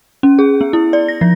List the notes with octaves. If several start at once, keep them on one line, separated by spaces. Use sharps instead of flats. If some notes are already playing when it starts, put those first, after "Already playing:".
C#4
G#4
B3
E4
D5
A#6
F3